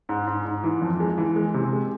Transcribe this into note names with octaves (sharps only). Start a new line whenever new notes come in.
G#2
G#2
G#2
E3
F2
G#3
E3
G#3
C3
G#3